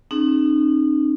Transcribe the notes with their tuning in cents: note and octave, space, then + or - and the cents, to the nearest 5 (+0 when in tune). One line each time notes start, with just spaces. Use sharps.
C4 +40 D#4 -30 G#4 +0